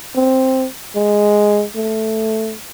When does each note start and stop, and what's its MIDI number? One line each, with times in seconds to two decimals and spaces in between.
0.16 0.66 60
0.95 1.64 56
1.75 2.55 57